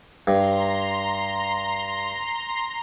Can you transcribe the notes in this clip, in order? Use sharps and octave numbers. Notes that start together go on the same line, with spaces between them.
G2 A#5 C6